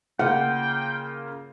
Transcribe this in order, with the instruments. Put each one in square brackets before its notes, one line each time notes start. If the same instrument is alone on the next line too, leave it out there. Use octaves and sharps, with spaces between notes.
[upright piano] C#3 A#3 F4 [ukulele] F#5 [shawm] G5